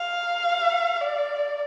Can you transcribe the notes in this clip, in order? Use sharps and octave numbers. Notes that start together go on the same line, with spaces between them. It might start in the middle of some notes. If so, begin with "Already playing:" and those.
Already playing: F5
D5